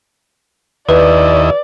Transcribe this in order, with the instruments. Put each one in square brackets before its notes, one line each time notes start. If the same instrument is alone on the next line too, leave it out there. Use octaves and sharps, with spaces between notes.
[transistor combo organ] D#2 E4 D#5 [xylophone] B4 [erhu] D5